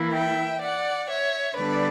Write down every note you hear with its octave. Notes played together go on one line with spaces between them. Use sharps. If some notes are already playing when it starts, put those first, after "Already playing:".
Already playing: E3 A#3 E4
E5 G5
D5 F#5
C#5 E5
D3 G3 B3 D4 B4 D5